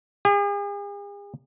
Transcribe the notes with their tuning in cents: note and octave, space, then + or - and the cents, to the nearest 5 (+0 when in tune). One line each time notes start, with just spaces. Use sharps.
G#4 -45